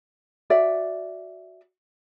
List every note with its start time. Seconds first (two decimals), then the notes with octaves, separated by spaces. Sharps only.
0.50 F#4 D5 E5